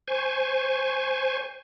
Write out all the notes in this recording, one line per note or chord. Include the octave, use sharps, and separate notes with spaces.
C5 G#5 C#6